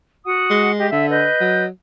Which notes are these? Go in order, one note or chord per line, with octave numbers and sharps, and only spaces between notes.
F#4 F#5 D#6
G#3
G4 D#5
D3 E5
B4 D#5 G6
F#3